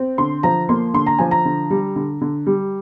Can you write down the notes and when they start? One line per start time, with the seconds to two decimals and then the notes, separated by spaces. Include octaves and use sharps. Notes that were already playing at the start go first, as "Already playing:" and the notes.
Already playing: C4
0.18 D3 C6
0.43 F3 A#5
0.69 A#3 C6
0.94 D3 C6
1.07 A#5
1.19 F3 G#5
1.31 A#5
1.45 D3
1.70 G3
1.96 D3
2.21 D3
2.47 G3